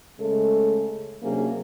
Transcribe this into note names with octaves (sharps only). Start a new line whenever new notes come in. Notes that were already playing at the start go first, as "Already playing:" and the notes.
C#3 G#3 A3 A4
C3 F#3 A#3 C#4 D4 G#4